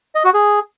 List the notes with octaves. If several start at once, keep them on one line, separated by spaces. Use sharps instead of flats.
D#5
F#4
G#4